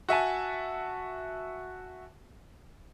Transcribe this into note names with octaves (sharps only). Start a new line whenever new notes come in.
F#4 E5 G#5 A5